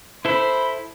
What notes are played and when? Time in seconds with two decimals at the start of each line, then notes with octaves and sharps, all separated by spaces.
0.25 E4 A4 C5 B5